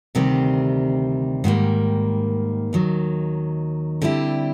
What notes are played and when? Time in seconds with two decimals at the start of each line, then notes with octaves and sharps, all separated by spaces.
0.15 D2 C3 D#3 G3 C4
1.44 G#2 D#3 G3 A#3
2.73 D#2 D#3 F#3
4.02 D3 G3 C4 E4 G4